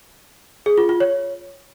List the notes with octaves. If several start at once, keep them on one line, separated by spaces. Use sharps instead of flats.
G#4
F4
F4
C#5